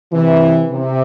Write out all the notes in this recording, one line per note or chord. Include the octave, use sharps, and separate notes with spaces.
C3 E3
C3